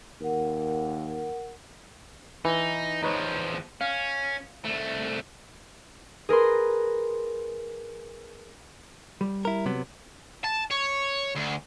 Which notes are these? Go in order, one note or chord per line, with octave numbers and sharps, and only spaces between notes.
D#2 A#4 F#5
E3 D#4
E2 F3 D#4 B4 C#5
C#4 F5
C2 A3
G#4 A#4 B4 C6
G3
E4 A#4
C3 F#3 B3
A5
C#5
D2